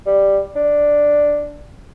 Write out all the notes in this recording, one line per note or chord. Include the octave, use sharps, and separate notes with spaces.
G3
D4